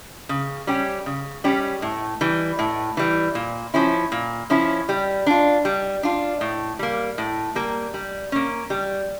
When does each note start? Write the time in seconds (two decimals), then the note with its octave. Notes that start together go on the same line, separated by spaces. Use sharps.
0.29 C#3
0.67 G3 C#4 G4
1.06 C#3
1.44 G3 C#4 G4
1.82 A2
2.21 E3 G3
2.59 A2
2.97 E3 G3
3.35 A#2
3.74 F3 C#4 E4
4.12 A#2
4.50 F3 C#4 E4
4.89 G3
5.26 D4 F4
5.65 G3
6.03 D4 F4
6.41 A2
6.79 G3 A#3
7.18 A2
7.55 G3 A#3
7.94 G3
8.32 A#3 C#4
8.70 G3